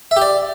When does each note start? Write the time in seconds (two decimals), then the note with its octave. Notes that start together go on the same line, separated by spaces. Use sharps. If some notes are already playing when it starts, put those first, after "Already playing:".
0.11 E5
0.16 G4
0.22 D5